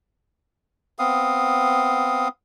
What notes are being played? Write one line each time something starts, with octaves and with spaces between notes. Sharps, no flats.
B3 C4 F5 D#6